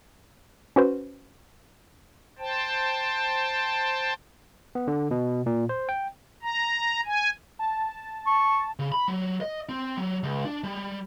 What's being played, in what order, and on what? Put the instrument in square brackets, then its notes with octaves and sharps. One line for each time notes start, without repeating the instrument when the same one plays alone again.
[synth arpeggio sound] C#4 F#4 B4 C5
[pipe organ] C5 G5 A5
[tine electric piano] B3
D3
B2
A#2
C5
G5
[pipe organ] A#5
G#5
[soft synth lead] A5
[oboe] C#6
[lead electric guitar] C#3
B5
F#3
D#5
C4
F#3
C#2
D4
G3